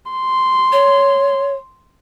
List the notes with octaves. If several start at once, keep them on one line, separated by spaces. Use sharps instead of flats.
C6
C#5